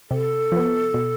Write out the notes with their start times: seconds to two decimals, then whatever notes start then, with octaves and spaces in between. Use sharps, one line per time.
0.10 C3 A4
0.52 F3 B3
0.94 B2